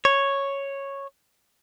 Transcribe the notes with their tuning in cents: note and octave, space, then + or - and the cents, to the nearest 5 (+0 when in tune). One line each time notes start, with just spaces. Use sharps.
C#5 -5